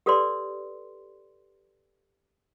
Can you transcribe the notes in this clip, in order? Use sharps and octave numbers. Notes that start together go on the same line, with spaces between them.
G4 A4 B4 D5 C6